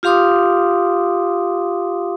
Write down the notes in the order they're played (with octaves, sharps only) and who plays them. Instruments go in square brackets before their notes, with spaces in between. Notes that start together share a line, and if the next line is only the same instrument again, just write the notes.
[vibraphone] F4 G4 F5 C6 D6 D#6